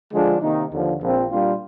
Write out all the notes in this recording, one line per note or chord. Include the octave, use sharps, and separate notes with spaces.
D3 F3 G#3 D4 F4
C3 D#3 A#3 D#4
D#2 D3 F3
A#1 A#2 F3 C4
A#2 G3 D4 F4